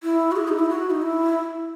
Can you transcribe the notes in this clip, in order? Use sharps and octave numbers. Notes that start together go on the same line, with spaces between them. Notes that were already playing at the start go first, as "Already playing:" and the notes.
E4
F#4
G#4
D#4
E4
F#4
D#4
E4